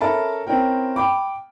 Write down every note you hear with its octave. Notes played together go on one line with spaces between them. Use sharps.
C#4 A4 A#4 E5 A5 B5
C4 C#4 E4 A#4 G5
G5 B5 D6